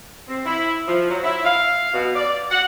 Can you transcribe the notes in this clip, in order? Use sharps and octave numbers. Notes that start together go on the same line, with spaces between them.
C4
E4
F3
F#3
E4
F5
B2
D5
F#5